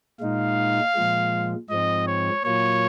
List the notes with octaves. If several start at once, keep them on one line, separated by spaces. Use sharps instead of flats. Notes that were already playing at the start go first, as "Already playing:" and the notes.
A#2 G#3 D#4 F5
A#2 F3 G#3
G#2 F3 G#3 C4 D#5
C#5
A#2 F#3 A#3 F4 C#5